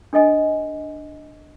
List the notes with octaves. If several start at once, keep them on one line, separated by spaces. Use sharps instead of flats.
D4 A4 D#5 G#5